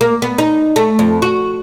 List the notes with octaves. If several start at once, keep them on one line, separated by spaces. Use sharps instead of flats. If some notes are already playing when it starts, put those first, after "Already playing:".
A#3
B3
D#4
A3
F2
F#4